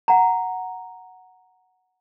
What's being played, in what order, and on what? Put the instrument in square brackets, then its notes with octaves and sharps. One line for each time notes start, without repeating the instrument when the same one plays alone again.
[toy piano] F#5 A#5